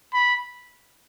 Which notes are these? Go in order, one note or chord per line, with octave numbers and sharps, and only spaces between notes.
B5